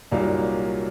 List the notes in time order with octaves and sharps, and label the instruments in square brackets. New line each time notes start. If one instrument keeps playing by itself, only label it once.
[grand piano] C2 A#2 F#3 A#3 D#4 F5